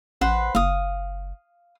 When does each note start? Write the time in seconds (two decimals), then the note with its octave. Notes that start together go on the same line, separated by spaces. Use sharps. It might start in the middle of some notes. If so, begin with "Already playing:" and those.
0.21 A1 B4 C5 F#5
0.55 F#1 F5 D#6